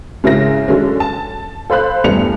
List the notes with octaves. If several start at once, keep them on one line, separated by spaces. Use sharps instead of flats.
G#2 C#3 E4 A#4 A#6
D3 F#3 G#3 C#4
A5
A4 C5 F5 B5 F#6
E2 G2 A3 B3 C#7 F7